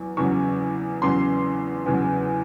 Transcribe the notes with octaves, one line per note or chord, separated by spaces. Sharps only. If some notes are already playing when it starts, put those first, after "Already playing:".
Already playing: E2 F#3
E2 C#3 F#3 C#6
E2 C#3 F#3 C6
E2 C#3 F#3